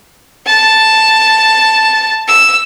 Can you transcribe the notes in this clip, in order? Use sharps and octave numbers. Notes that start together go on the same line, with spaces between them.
A5
E6